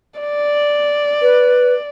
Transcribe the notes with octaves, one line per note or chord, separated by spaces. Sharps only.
D5
B4